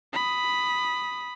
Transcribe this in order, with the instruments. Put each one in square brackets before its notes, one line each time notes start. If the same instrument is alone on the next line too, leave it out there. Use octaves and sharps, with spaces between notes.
[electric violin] B5 D#6